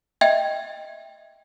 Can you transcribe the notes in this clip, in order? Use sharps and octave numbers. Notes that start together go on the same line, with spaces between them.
D#5 E5 G5 G#6